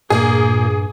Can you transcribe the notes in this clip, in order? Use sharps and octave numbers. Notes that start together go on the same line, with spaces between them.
G2 A#2 A#3 G#4